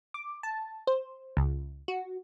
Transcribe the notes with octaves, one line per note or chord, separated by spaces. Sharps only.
D6
A5
C5
C#2
F#4